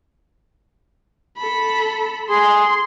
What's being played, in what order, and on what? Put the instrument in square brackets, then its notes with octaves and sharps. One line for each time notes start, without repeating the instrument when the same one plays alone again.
[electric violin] A4 B5
[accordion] G#4 [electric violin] C6